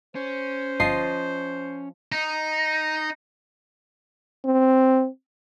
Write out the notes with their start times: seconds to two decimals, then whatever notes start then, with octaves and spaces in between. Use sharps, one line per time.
0.15 C#4 C5
0.80 G1 F3 F4 D#5 C7
2.12 D#4
4.45 C4